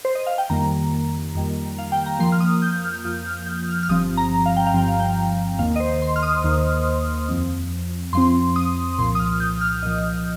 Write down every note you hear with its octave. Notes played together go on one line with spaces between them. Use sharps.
C5
D#5
F5
G5
F2 D#3 G3 A#3 A#5
F2 D#3 G3 A#3
F5
G5
A#5
F2 F3 A#3 C6
F6
D#6
G6
F6
F2 F3 A#3 G6
F6
G6
F6
F6
G1 G2 F3 C4 D#6
A#5
F5
G5
F5
G1 G2 F3 C4 G5
F5
G5
F5
D#2 D#3 A#3 F5
D#5
C5
C6
F6
D#6
D#2 D#3 A#3
F2 F3 C4
F2 F3 C4 C6
D#6
C2 A#2 F3 C6
D#6
F6
G6
F6
C2 A#2 F3 D#5